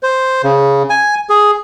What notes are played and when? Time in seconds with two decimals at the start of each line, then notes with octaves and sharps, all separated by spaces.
0.03 C5
0.43 C#3
0.90 G#5
1.29 G#4